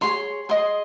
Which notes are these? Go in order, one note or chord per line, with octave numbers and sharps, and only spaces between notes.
G#4 C#5 C6
G#4 D#5 C6